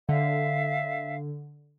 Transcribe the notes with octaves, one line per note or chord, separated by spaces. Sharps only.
D3 E5 F5